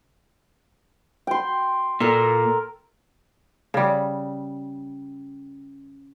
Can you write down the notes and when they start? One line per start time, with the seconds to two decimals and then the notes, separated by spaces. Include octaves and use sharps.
1.27 G5 C6
2.00 A#2 A4 A#4
3.74 C#3 G3